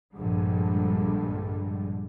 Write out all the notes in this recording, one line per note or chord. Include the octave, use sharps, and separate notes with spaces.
A#1 G2 D3 G3 G#3